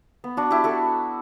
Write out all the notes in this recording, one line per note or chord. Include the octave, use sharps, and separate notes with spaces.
B3
D4 F#4
E4 G4
F#4 A4